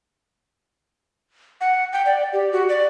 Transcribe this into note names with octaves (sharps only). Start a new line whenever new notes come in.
F#5
G5
D5
G4
F#4
D5